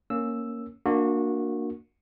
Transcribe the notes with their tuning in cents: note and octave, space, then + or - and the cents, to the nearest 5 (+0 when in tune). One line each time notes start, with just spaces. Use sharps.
A#3 +0 C#4 +0 E6 +0
A#3 +0 D4 +10 F#4 -25